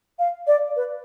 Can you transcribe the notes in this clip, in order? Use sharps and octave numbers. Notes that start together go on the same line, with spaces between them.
F5
D5
B4